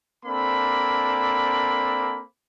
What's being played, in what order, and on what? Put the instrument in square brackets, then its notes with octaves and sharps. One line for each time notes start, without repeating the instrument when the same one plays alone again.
[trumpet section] A#3 C4 D4 A4 B5